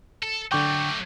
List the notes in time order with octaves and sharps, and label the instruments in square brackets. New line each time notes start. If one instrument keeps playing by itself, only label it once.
[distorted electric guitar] A4
[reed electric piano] D3 G5 [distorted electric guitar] F#3 A3 [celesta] C#6 D6 G6